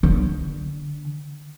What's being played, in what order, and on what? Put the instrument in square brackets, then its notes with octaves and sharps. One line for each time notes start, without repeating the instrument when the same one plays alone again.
[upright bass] D3